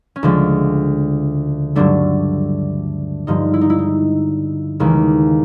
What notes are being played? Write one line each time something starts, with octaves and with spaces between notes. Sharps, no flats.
C#4
D2 C#3 F3 G#3 D4
G2 D3 F#3 A3 D4
G2 D3 F3 G#3 D#4
E4
D#4
E4
D#4
D#2 C#3 E3 G#3